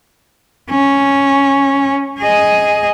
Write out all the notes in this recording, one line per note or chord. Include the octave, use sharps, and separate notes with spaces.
C#4
G#4 D#5